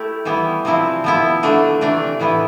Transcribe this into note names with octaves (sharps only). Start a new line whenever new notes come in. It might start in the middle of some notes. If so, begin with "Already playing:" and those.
Already playing: A3 E4 G4
E3 G3 B3 E4
C3 F3 C4 E4
F3 B3 E4
D3 A3 D4
C3 E3 A3 D4
A2 E3 B3 E4 B4